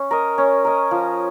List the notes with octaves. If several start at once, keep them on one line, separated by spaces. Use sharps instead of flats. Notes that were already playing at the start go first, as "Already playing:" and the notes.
Already playing: C#4
A#4 D#5
C#4
A#4 D#5
F3